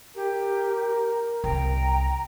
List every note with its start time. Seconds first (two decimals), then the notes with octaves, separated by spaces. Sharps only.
0.15 G4 A#4
1.44 C2 G5 A#5